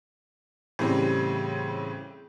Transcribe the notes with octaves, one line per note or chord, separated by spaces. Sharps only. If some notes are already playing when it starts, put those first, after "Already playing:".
A2 C#3 E3 G3 C4